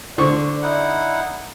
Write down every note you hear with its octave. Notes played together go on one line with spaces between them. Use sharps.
D3 C5 D5 C#6
D#4 E4 F#5